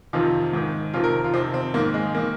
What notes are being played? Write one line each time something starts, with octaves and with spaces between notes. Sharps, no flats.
F2 C3 D#3 F4
G#2 D#3
F2 C3 D#3 F4
A#4
F4
F2 C3 D#3 C4
C4
G#2 D#3 A#3
G#3
D#3 A#3